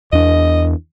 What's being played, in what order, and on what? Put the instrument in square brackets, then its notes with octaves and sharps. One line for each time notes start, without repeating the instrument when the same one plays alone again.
[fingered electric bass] E2 D4 [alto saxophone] D#5